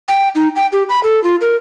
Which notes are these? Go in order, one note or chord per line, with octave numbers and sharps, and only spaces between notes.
G5
D#4
G5
G4
B5
A4
F4
A#4